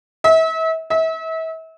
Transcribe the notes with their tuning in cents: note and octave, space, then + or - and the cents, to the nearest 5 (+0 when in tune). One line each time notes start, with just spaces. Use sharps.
E5 -35
E5 -35